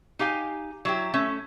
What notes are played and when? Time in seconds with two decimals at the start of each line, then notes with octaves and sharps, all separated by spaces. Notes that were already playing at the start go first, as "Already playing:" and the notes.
0.19 D#4 G4 F5 G#5
0.85 F#3 E4 G4
1.14 A3 C#4 E5